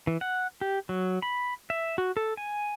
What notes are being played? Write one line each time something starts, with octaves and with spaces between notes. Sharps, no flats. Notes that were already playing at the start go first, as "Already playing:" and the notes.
E3
F#5
G4
F#3
B5
E5
F#4
A4
G#5